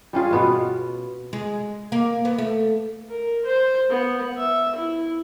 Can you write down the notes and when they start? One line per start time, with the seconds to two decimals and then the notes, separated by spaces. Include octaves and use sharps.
0.13 G3 C#4 F4 G#4
0.31 B2 B3 F4
1.33 G#3
1.92 A#3
2.25 B3
2.38 A3
3.10 A#4
3.45 C5
3.89 B3
4.37 E5
4.75 E4